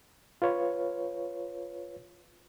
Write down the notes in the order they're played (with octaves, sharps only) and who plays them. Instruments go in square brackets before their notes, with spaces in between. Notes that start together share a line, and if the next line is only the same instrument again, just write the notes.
[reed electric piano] F4 B4 C#5